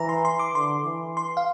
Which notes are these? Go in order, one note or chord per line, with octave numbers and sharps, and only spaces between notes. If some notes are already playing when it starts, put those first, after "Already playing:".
Already playing: E3 A#5
C6
C6
D6
D3 C6
E3
C6
F5